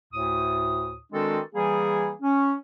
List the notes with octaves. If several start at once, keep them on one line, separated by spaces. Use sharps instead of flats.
D2 A2 D#6
D#3 G#3 C4 D4 F#4 A4
E3 G3 A#3 G#4
C#4